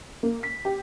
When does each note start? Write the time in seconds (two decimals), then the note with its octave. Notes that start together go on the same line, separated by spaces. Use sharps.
0.23 A#3
0.43 B6
0.65 G4